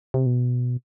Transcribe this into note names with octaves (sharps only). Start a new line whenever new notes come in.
C3
B2